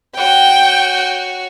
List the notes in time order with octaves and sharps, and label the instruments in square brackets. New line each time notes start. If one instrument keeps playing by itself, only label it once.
[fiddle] F#4 C#5 [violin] G5